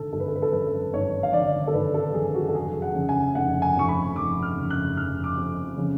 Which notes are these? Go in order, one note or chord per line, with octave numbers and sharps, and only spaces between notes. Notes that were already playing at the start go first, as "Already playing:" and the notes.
Already playing: G#1 D3 A4
G#1 A4
B4
A4
B4
A4
F#2 B4
G#1 C#5
F5
D3 D5
A4
G#1 B4
A4
F#2 G#4
F#4
A4
F1 G#4
F#5
C#3
G#5
F1 F#5
G#5
F2 C#6
B5
F1 D6
F6
C#3
F#6
F1 F6
D6
F2
C#3